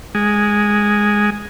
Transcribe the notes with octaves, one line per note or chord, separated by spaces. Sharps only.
G#3